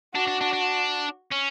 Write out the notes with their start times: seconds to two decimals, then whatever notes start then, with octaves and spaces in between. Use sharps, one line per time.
0.14 D4 F#4
0.28 D4
0.41 D4
0.53 D4
1.32 C#4